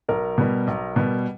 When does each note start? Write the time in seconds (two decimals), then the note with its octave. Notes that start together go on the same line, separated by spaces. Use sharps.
0.09 B1 A#4
0.38 B2 G3
0.67 B1
0.96 B2 G3